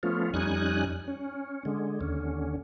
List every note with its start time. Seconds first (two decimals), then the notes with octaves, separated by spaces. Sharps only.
0.03 F3 A3 B3 C#4 F4
0.34 F2 G3 C#4 D#4 G#5 F#6
1.08 C#4
1.65 D3 G#3
2.01 D#2 D3 C#4